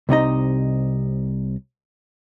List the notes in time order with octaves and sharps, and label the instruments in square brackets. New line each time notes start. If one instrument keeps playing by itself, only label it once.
[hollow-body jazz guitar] C2 C3 D#4 D#5